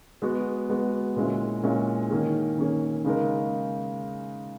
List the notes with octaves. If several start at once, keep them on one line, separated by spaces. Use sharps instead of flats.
G#3 B3 F#4
G#3 B3 F#4
A#2 G#3 C#4 E4
A#2 G#3 C#4 E4
D#3 A#3 C#4 G#4
D#3 A#3 C#4 G#4
C#3 G#3 D#4 A#4